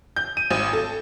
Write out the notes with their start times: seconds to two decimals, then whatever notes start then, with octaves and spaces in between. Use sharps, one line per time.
0.16 G6
0.37 D#7
0.51 G#1
0.73 A4